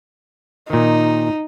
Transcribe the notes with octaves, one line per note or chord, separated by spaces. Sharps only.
A#2 D#3 D#4